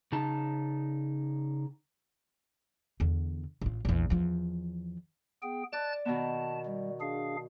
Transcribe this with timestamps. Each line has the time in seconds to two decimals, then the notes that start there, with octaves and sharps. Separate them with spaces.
0.12 C#3 D#4 A5
3.00 E2 D3
3.62 A1 F4
3.85 A#1 E2
4.10 E2 F3
5.43 B3 G#4 G5
5.73 D5 A5 F#6 A6
6.05 B2 D#3 B3 A5
6.66 G3
7.01 D4 G#4 F5